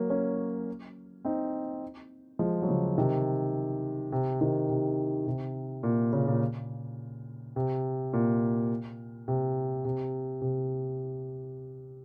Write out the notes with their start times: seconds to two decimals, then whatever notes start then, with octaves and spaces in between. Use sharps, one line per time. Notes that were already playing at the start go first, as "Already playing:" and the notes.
Already playing: F#3 A#3
0.10 A#3 C#4
1.25 C4 D#4
2.39 F3 G#3
2.62 F#3
2.69 C#3 F3
2.98 C3 D#3
4.12 C3
4.40 C3 D#3
4.69 C3
5.27 C3
5.83 A#2
6.13 A#2 C#3
6.27 A#2
7.56 C3
8.13 A#2
9.28 C3
9.85 C3
10.41 C3